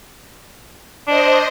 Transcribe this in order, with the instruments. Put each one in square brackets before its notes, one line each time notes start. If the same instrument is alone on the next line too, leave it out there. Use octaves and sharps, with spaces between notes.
[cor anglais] D4 [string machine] C5 D#5